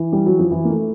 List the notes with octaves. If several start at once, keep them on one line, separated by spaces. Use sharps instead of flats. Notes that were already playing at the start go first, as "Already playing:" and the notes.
Already playing: E3
G3
F#3
F3
E3
A#3
A3